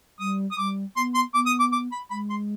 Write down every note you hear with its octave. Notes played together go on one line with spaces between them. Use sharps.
G3 D#6
D#6
G3 D6
B3 C6
C6
B3 D6
D#6
D6
D6
B5
G#3 B5
C6